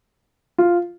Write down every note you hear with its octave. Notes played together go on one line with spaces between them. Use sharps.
F4